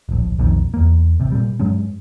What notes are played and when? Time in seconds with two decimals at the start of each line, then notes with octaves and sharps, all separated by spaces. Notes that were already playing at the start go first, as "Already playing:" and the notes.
0.09 D1 A#1
0.39 B1 F2 A#2 D#3
0.74 E2 A#3
1.20 A1 C3
1.32 A#2 G3
1.60 G2 F#3 G#3 C#4